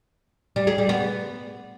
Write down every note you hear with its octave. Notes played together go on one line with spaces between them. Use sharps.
G3
G#4
G3
B3